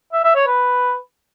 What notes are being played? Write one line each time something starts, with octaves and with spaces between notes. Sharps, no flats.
E5
E5
C#5
B4